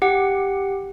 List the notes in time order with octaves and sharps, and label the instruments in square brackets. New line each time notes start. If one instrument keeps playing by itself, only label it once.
[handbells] G4 F#5